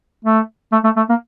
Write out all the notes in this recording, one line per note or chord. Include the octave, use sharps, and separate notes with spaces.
A3
A3
A3
A3
A#3